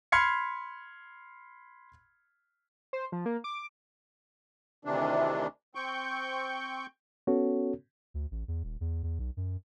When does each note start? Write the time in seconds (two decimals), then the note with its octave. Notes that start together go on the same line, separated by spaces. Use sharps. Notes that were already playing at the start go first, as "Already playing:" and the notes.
0.12 B5 C6 F6 G#6 C7 C#7
2.93 C5
3.12 F3
3.26 A#3
3.44 D6
4.85 D2 C3 D#3 E3 D4
5.75 C4 G5 C#6 G6
7.27 B3 C#4 F#4 A4 C#5
8.14 D2
8.31 A1
8.48 E2
8.64 D#1
8.81 E2
9.03 E2
9.19 B1
9.37 F#2